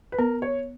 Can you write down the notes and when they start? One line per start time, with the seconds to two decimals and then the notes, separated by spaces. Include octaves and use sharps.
0.12 B4
0.19 B3 A#4
0.42 C#5